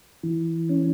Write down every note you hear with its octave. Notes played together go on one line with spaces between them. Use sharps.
E3
C#4